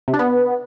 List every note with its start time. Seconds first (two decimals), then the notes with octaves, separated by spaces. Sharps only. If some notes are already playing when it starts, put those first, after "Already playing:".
0.08 C3
0.13 D4
0.19 B3